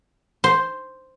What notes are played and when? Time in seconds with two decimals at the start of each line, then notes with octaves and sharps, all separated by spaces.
0.44 C5